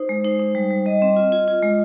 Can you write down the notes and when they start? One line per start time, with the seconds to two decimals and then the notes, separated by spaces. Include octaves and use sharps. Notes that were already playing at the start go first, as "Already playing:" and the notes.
Already playing: D#4 C5
0.09 G#3
0.25 D#4 C5
0.39 D#4
0.55 G3
0.71 G3
0.86 G3 D#5
1.02 C4
1.16 F4
1.32 F4
1.48 F4
1.63 G#3